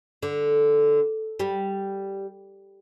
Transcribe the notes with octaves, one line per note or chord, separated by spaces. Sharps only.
D3
G3